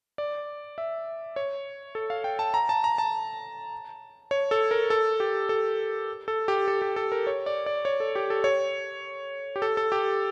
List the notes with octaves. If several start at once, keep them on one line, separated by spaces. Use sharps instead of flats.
D5
E5
C#5
A4
F5
G5
A5
A#5
A5
A#5
A5
C#5
A4
A#4
A4
G4
A4
A4
G4
A4
G4
A4
A#4
C#5
D5
D5
C#5
A4
G4
A4
C#5
G4
A4
A4
G4